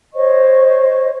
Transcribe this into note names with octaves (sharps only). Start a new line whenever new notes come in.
C5 C#5 D#5 C#6